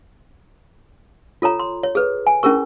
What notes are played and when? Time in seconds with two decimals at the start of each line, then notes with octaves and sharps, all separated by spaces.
1.42 F4 A4 C#5 A#5
1.59 C6
1.83 C#5
1.95 G#4 A4 B4
2.27 G#5
2.43 C#4 E4 G#4 A#4 C#6